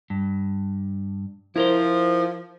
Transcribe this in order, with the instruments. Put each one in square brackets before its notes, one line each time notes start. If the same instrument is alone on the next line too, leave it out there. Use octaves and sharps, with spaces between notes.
[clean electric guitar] G2
[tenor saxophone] F3 [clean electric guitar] E4 A#4 C5